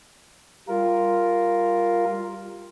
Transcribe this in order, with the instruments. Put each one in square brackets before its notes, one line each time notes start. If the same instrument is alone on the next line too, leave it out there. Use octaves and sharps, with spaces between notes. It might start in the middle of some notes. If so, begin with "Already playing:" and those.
[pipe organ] G3 F4 A#4